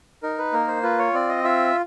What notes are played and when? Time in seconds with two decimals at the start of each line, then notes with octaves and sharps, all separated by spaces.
0.23 D#4 A#4
0.38 B4
0.52 A#3 A#4
0.68 C5
0.83 F4 B4
0.99 C#5
1.14 C4 D5
1.29 D#5
1.44 F4 E5